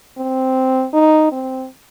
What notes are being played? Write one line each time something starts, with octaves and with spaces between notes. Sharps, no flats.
C4
D#4
C4